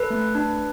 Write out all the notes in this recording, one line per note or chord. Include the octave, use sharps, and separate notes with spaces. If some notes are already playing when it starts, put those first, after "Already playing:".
Already playing: A4 B4
A3
D4